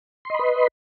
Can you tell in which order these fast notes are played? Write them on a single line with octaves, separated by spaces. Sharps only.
C6 D#5 B5 B4